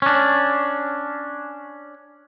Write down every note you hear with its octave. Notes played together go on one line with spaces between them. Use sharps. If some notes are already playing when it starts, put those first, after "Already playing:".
C#4 D4